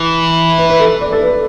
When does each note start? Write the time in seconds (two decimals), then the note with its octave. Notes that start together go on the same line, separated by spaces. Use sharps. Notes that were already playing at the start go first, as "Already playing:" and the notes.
Already playing: E3
0.58 B4
0.70 B4
0.80 A4
1.01 D5
1.12 A4
1.22 B4